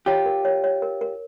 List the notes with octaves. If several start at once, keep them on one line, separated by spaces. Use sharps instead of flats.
F4 G4 C#5
A#4
C#5
C#5
A#4
A#4